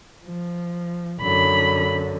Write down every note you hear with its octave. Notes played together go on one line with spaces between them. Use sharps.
F3
F#2 D3 B5